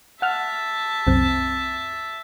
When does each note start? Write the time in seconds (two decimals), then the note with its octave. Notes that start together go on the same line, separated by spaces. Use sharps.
0.22 E5 F#5 A5 F6
1.07 C2 F#2 C4